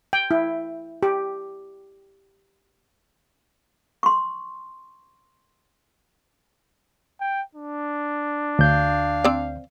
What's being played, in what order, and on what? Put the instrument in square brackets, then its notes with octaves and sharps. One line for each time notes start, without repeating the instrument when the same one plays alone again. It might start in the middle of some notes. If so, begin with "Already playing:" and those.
[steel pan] G5
E4
G4
[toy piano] C6 C#6
[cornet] G5
D4
[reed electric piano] D2 G6 [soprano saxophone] F5
[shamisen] C4 D5